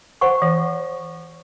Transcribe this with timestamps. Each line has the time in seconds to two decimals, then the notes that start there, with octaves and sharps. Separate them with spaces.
0.21 C5 F#5 C#6
0.42 E3